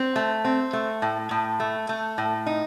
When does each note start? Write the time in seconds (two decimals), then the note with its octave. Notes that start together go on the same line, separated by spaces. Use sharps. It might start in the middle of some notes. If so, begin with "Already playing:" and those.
Already playing: C4
0.16 A3
0.45 C4
0.73 A3
1.02 A2
1.31 A2
1.60 A3
1.89 A3
2.18 A2
2.46 D#4